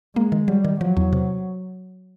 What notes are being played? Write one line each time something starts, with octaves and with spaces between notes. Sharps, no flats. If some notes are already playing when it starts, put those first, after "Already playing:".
G#3 A#3
D#3
F#3 G3
D#3
F3 F#3
E2
C3